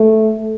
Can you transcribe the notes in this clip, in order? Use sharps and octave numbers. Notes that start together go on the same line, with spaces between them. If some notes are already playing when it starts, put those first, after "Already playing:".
Already playing: A3